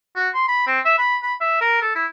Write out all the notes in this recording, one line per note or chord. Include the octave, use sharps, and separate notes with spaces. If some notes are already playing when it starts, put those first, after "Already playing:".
F#4
C6
B5
C4
E5
B5
B5
E5
A#4
A4
E4